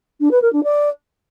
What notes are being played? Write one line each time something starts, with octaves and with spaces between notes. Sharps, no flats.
D4
B4
A#4
D4
D5